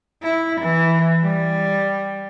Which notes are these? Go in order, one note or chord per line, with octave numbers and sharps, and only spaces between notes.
E4
E3
G3